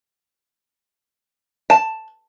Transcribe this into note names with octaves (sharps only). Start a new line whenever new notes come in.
A5